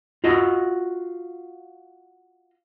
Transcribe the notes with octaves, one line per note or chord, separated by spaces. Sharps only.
F4 F#4 D#5